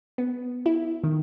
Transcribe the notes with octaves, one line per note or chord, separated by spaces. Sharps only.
B3
E4
D#3